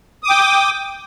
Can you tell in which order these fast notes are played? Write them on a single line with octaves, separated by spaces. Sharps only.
D#6 D6 G5